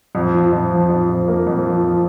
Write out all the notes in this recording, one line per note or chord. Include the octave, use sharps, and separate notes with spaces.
F2
F3
F2
F3
F2
F2
A#3
F2
F3
F3